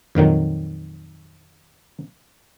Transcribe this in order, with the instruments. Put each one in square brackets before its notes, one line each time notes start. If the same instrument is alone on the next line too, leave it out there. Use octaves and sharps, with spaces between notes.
[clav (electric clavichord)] F2 A#2 D#3 F#3